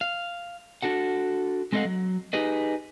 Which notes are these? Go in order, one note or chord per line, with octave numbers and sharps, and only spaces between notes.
F5
D4 F#4 A4 F#5
G#3 C4 A4 D#5 F5 F#5
F#3
D#4 G4 G#4 B4 D#5